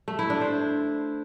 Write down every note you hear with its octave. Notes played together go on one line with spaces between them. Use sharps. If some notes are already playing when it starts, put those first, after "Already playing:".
A3
E4
D4
C5